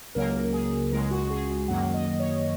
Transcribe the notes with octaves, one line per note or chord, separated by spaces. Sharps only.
C#2 C#3 F#3 A#3 A#4
G#4
C#2 C#3 G#3 A#4
F#4
G#4
F#2 D#3 F#3 A#3 F#5
D#5
C#5